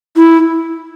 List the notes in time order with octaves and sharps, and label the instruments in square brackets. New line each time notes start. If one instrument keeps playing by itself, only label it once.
[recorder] E4